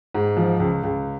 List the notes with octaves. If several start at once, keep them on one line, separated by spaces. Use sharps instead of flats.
G#2
F3
C#2
C#2